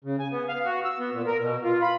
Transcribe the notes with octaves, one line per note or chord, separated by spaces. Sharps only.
C#3
G#5
B3
F5
F#4
E6
B3
A#2
A#4
B2
F4
B5